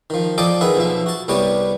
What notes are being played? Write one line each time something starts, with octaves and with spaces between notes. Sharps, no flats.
D#3 F3
F3 A4 D5 D#5 G5 A5
D#3 G#4 B4 E5 F#5
B1 B2 F3 E5
F#4 A5
C2 C3 G3 B3 C#5 A5